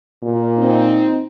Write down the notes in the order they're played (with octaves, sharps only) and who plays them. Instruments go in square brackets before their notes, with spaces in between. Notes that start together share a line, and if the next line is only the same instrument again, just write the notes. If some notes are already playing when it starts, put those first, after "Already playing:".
[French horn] A#2
[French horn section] C4 D#4